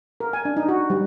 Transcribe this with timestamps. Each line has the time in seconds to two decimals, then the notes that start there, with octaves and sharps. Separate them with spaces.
0.20 A#4
0.33 G#5
0.45 D4
0.57 D#4
0.68 F#4
0.90 G3